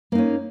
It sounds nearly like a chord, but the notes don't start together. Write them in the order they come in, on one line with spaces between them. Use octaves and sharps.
A#3 D#4 C#4